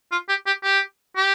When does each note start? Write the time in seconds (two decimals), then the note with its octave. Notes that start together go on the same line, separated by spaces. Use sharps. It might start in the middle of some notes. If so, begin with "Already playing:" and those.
0.11 F4
0.29 G4
0.46 G4
0.64 G4
1.16 G4